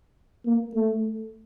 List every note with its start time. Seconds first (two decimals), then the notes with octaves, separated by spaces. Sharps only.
0.46 A#3
0.74 A3